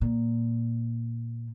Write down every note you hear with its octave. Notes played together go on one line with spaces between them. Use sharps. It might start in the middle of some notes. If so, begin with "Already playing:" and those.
A#2